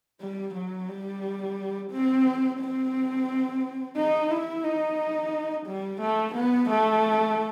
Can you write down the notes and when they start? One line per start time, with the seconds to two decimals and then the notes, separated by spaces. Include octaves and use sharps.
0.22 G3
0.55 F#3
0.89 G3
1.92 C4
2.60 C4
3.97 D#4
4.31 E4
4.64 D#4
5.66 G3
6.01 A3
6.35 B3
6.70 A3